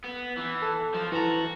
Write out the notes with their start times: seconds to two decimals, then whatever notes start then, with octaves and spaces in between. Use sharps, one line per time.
0.04 B3
0.37 E3
0.62 A4
0.94 F3
1.12 E3 F#4 A5 A#5